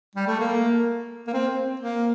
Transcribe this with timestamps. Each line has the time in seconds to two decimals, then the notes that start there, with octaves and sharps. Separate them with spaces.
0.15 G3
0.27 A3
0.40 A#3
1.27 A#3
1.34 C4
1.80 A#3